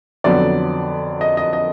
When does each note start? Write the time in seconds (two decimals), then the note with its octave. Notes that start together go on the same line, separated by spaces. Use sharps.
0.24 F2 D3 F#3 B3 D5
1.21 D#5
1.37 D#5
1.53 D#5